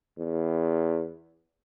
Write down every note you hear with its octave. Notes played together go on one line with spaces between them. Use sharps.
E2